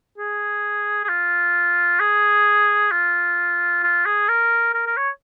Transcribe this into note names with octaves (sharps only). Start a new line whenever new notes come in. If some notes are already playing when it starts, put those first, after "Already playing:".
G#4
G#4
F4
G#4
F4
F4
G#4
A#4
A#4
A#4
C#5